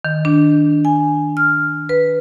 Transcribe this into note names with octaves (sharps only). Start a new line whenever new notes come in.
D#3
D4
G#5
F6
B4